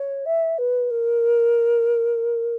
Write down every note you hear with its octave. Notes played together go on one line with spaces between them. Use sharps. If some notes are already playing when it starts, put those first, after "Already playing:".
Already playing: C#5
E5
B4
A#4